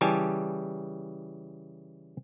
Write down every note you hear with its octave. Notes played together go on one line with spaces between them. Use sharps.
C#3 E3 G3 G4 G#5 A5